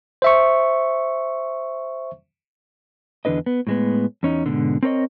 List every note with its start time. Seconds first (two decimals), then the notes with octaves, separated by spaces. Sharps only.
0.22 C5 E5 C#6
3.25 E2 D3 D4 B4 D#5
3.46 B3
3.67 A2 G#3 B3
4.23 E2 C#4 D#4
4.46 G#2 B2 D3
4.83 C4 A#4 C#5 D#5